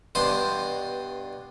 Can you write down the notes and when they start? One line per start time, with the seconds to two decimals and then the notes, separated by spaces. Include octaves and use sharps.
0.15 G2 B2 C5 A5 C6 D#6